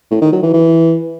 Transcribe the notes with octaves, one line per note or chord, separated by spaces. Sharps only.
A2
D#3
F#3
E3
E3